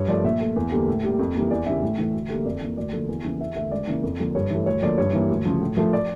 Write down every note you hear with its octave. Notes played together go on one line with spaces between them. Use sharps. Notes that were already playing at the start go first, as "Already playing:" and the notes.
Already playing: G2 C#5
F3 A3 D5
A#2 E5
A3
E2
D3 G3 A#3
A2
G3 A#3
F2
E3 G3 A#3
E2 D5
C#3 E3 G3 E5
A2
E3 A3
D2
D3 G3 A#3
F2 D5
E3 A#3
D2 D5
D3 F3 A#3
E2
C#3 E3 A#3
E2 E5
D3 A3 E5
C#2 D5
C#3 E3 A#3
F2
D3 F3 A#3
G2 C#5
E3 A3
D2 C#5
D3 F3 A#3 D5
G2 C#5
E3 G3 A#3
D2
C#3 F3
A2
F3 A3
D5